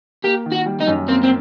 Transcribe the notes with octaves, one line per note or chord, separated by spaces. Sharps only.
A#3 G4
D#3
F#4
G3
D#4
F#2
A#3 C4
C4